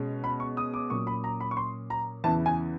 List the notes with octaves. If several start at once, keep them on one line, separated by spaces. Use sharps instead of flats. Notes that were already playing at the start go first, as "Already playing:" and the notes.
Already playing: B2 G#3 C#4
B5
C#6
D#6
D6
A#2 F#3 A#3 C#4 C#6
B5
A#5
B5
C#6
C6
A#5
E2 C#3 E3 A5
G#5